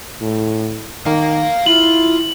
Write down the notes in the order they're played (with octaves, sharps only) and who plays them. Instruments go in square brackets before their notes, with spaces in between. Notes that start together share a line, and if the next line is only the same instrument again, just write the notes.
[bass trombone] A2
[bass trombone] D#3 [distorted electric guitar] F5 A#5
[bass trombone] E4 [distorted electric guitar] F4 [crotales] F#7